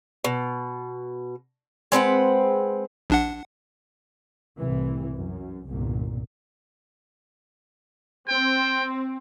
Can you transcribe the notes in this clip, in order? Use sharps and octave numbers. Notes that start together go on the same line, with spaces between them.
B2
G#3 C4 B4 F#5
A#1 D4 F#5
C2 A2 C3 E3
F#2
G1 C2 A#2
C4 G5